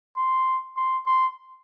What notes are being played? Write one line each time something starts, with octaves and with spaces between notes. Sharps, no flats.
C6
C6
C6